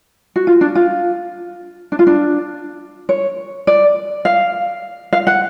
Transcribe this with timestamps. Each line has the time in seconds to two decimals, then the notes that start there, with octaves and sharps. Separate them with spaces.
0.36 F#4
0.47 F4
0.61 D4
0.75 F4
1.92 D4
1.99 F4
2.07 D4
3.09 C#5
3.67 D5
4.25 F5
5.13 F5
5.27 F#5